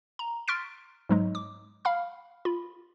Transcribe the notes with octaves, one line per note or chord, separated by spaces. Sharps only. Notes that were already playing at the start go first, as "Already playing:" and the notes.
A#5
C6 C#6 F6 A6 B6 D7
G#2 F#3 G#3
D6
F5 B5 F6
F4 B5